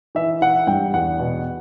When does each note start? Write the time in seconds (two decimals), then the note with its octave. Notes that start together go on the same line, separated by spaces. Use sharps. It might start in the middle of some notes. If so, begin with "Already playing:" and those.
0.15 E3 E5
0.41 E3 F#5
0.67 G2 G5
0.94 E2 F#5
1.19 B2